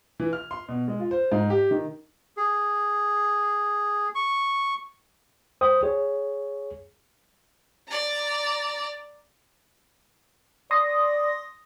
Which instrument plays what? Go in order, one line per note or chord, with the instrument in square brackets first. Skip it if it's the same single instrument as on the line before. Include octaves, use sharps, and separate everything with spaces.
[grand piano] E3
F6
C6
B2
G#3
F4
C5
G#2
G4
D#3
[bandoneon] G#4
C#6
[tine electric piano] C5 G5 D#6
G#4 C#5
[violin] D5 A#5
[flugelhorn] D5 [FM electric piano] C6 D#6 A#6